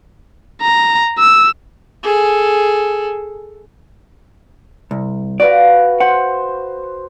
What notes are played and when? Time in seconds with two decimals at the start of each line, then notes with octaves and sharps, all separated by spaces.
0.62 A#5
1.19 E6
2.03 G#4 A4
4.91 C2
5.40 F#4 B4 D5 F5
6.00 C5 F#5